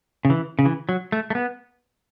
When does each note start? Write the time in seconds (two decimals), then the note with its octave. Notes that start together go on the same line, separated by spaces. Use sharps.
0.25 C#3
0.30 E3
0.59 C#3
0.65 E3
0.89 F#3
1.12 A3
1.30 A3
1.35 B3